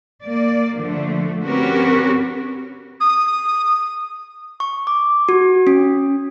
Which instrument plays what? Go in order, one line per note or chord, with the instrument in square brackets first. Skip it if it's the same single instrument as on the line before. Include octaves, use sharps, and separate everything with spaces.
[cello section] A#3 D5
D3 F3 A3
C4 C#4 F#4 G4 A#4 B4
[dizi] D#6
[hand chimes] C#6
D6
F#4
C#4